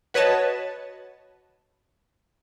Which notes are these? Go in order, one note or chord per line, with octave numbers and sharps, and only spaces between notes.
F#4 B4 C#5 D#5 A5